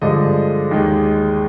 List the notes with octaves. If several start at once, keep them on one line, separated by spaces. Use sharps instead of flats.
G2 D3 F3 G#3 D#5
D#2 D#3 G#3